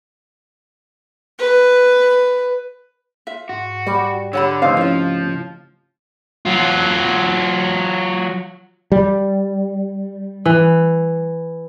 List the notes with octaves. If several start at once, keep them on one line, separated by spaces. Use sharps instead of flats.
B4
F4 E5
G#2 F#4
G3 D5 G5
D3 G4 C#5 F#5 B5 E6
C#3 F3 A3 C4 D#4 B4 C5 F5
F3 C#4 E4 C#5 F5
F#3 F4
G3
E3